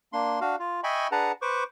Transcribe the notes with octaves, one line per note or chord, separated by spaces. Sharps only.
A#3 D4 C6
D4 F#4 F5
F4
D#5 E5 G5 G#5 B5 C#6
D4 G#4 B4 F#5 A5 A#5
B4 C5 C#6 D6